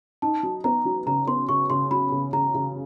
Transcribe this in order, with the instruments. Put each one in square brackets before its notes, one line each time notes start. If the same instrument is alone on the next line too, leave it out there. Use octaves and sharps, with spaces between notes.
[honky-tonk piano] D#4 [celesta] A5
[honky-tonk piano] F#3
[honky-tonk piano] B3 [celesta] A#5
[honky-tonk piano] F#3
[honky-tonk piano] C#3 [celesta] A#5
[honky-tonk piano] B3 [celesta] C6
[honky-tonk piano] C#3 [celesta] C#6
[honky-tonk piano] C#3 [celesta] C6
[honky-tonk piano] F#3 [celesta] B5
[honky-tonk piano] C#3
[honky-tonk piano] C#3 [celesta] A#5
[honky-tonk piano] C#3